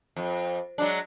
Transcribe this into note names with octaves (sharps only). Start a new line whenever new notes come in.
F2
F#3 G#3 D4